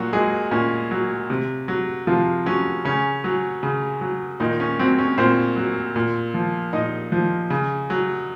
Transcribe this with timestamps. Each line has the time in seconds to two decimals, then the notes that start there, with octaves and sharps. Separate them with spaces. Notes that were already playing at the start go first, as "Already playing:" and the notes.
Already playing: A#2 F#3 F#4
0.13 F#3 G#3 G#4
0.51 A#2 C#4
0.91 F#3
1.30 C3
1.68 F#3
2.07 C3 F3 F4
2.46 F#3 C#4
2.85 C#3 C#4
3.24 F#3
3.63 C#3
4.01 F#3
4.40 A#2 D#3 D#4
4.60 C#4
4.79 F#3 C4
4.98 C#4
5.18 A#2 C4 C5
5.56 F#3
5.96 A#2
6.34 F3
6.73 A#2 D#4 D#5
7.12 F3
7.50 C#3
7.90 F#3